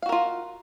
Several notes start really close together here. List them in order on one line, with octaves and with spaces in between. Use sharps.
F5 F#4 A#4 F4